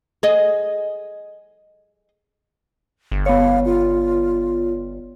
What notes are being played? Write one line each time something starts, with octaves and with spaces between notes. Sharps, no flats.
G#4 D#5
G1
B3 C#5 F5
F4